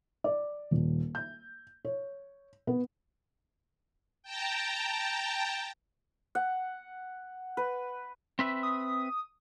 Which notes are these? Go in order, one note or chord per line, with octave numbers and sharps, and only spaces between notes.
D5
D#1
G6
C#5
B3
G5 A5 A#5
F#5
B4
C4 B4 E5
D#6